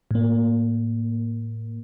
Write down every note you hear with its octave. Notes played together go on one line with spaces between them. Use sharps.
A2 A#3